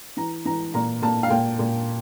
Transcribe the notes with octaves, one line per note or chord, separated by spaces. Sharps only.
E3 A#5
E3 A#5
A#2 A#5
A#2 A5
F5
A#2 G5
A#2